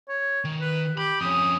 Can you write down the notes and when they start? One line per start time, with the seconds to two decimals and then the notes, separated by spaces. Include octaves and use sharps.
0.09 C#5
0.45 D#3
0.61 B4
0.98 G4 B5
1.21 F2 C#4 D#6